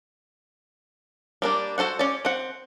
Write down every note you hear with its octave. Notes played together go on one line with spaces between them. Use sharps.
G3 A#3 D4
F#4 A4 C5 F#5
C#4 D5
C4 F#5